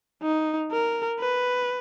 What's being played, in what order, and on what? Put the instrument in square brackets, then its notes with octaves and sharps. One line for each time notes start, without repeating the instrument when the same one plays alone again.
[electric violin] D#4
A#4
B4